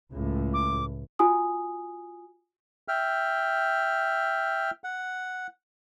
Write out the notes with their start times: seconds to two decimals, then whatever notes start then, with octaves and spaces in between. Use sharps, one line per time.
0.13 C#2 A2
0.54 D6
1.19 F4 F#4 G#5 D#6
2.88 E5 G5 F6
4.84 F#5